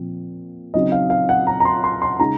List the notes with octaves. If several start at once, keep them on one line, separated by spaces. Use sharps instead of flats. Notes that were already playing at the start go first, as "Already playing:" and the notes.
Already playing: A#2 F3 C4
C#3 F#3 C4 D#4 D#5
F5
F5
F#5
A#5
A#5
C6
C6
C6
C#3 G#3 D#4 A#5